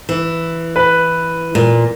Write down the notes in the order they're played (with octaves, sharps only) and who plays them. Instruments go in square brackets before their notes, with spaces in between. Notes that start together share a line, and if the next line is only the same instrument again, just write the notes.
[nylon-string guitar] E3
[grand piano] B4
[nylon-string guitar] A#2